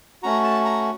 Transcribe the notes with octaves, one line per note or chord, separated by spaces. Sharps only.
A3 C#4 F#4 A#5
A5
A#5